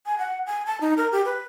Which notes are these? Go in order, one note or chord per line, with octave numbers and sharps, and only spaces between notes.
G#5
F#5
G#5
A5
D#4
A#4
G4
B4